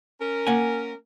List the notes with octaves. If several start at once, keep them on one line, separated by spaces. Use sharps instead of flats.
C#4 A#4
A#3 F#5 G#5